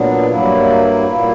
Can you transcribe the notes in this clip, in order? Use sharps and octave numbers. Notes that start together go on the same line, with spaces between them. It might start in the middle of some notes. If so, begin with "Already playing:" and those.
Already playing: A#2 F#3 B3 D4
G2 F#3 A#3 E4
A#2 A#3 E4